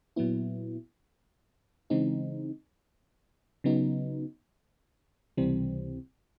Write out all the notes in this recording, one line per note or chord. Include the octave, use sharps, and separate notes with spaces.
A#2 F#3 B3 E4
C#3 E3 G#3 C4 D#4
C#3 F#3 B3 D#4
C#2 C3 E3 G3 C4